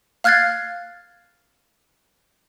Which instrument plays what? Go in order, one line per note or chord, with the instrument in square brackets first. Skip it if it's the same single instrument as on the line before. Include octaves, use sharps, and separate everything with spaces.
[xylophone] F5 F6 F#6 G#6 A6 C7